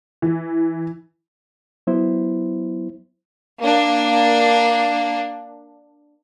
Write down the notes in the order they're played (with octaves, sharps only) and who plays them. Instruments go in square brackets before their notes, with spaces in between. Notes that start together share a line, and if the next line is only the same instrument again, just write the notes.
[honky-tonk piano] E3
[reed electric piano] F#3 B3 E4 C5
[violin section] A#3 D4